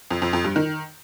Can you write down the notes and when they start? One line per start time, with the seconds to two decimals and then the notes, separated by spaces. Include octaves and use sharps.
0.11 F2
0.22 F2
0.33 F2
0.44 G2
0.56 D#3